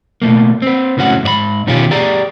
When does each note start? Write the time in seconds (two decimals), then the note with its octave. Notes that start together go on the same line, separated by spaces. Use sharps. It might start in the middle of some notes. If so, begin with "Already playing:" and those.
0.22 B2 A3 A#3
0.62 C4 B4
0.97 C#2 A2 C#4 F#4 F#5
1.23 G#2 D5 B5
1.67 B2 D#3 C#4 F4 G4
1.91 G4 G#4 D5 G5 A#5